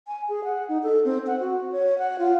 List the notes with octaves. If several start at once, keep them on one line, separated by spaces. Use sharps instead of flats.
G#5
G#4
F#5
D#4
A4
C4
F#5
F#4
C#5
F#5
F4